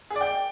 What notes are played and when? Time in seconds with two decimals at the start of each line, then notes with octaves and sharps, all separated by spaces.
0.10 G#4
0.16 D5
0.21 G5